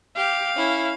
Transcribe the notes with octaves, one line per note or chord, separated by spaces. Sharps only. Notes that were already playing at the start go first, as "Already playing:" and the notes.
G4 F5
C#4 E4